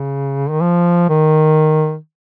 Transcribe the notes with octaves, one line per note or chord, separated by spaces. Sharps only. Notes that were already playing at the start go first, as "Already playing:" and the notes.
Already playing: C#3
D#3
F3
D#3